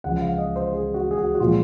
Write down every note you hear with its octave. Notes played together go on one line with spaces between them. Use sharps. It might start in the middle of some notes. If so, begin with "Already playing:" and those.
C#2 C#3 F3 G#3 F#5
F#5
F5
D#5
C5
G#4
F#4
G#4
F#4
F#4
A#2 F3 G#3 F4